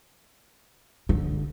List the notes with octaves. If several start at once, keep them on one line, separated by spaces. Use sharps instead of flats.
D3